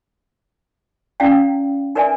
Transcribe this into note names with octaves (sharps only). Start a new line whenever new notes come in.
C#4 E4 D5 F5 G5
D#4 A#4 B4 D5 E5 G#5